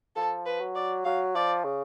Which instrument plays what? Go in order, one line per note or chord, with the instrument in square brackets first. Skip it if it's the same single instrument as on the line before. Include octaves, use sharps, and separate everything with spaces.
[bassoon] F3 [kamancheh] A4
[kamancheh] B4
[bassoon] F#3
[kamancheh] D5
[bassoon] F#3 [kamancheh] F5
[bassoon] F3 [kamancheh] D5
[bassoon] C#3